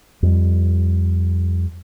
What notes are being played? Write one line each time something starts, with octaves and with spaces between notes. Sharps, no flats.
F2 G3